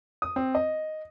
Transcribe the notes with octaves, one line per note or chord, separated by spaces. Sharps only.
D#6
C4
D#5